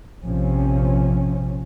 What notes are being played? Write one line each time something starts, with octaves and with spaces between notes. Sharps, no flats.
A#1 C3 F3 C#4